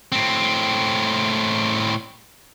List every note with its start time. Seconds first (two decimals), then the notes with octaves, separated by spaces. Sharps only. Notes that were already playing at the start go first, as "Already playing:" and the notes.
0.12 A2 C4